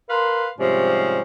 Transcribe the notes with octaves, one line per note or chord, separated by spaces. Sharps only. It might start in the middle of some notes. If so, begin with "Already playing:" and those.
A#4 B4 F5 C6
G#2 C3 F3 G3 C#4